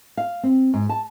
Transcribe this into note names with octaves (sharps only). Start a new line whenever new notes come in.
F5
C4
G#2
A5